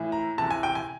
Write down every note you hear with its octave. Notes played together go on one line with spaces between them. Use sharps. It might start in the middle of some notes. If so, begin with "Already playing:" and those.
Already playing: A2 E3
A#5
C3 E3 A5
G#5
G5
G#5